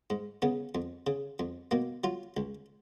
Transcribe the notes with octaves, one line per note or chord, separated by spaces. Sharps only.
G#2
C#3 B3
F2
C#3
F2
B2 A#3
F#3 F4
C#2